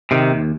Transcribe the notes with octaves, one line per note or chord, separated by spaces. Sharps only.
C3 D#3
D#2